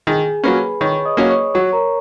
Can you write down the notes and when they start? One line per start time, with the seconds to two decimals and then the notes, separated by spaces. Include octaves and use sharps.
0.07 D#3 G#4 G#5
0.44 F#3 A#3 C#4 B4 B5
0.81 D#3 C#5 C#6
1.05 D#5 D#6
1.17 F#3 A#3 C#4
1.29 C#5 C#6
1.54 F#3 C#5 C#6
1.73 A#4 A#5